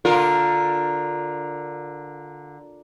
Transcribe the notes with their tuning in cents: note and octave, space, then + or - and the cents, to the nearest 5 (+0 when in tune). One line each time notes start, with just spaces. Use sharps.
D3 +0 F4 +15 A#4 +0